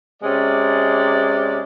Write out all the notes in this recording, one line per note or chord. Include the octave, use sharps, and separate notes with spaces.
C3 G#3 C#4 D5